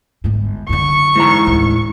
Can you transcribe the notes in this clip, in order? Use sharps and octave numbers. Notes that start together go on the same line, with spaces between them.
G1 G#2
F#2 D3 C#6
G#2 E3 A#5
D#2 A2